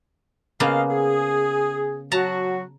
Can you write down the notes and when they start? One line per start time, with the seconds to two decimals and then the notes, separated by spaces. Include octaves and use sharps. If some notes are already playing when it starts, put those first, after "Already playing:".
0.60 C#3 A#3 B3 A#4 D#5 F5
0.90 G#4
2.12 F#3 F#4 A5 A#5